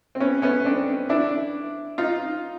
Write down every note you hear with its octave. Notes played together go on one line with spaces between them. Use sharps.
C4
B3 C#4
B3 C#4
C4 D4
D4 E4
D#4 F4